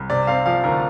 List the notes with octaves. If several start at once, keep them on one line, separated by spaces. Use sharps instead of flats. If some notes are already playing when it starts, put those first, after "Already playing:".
Already playing: C2
C3 D5
C4 F5
F3 F5
D2 A#4